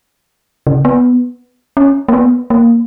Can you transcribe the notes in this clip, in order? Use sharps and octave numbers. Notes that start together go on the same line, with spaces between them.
C#3
B3
C#4
A#3
B3
A#3